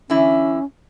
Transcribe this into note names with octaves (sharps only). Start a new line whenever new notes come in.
D3 E3 C#4 E4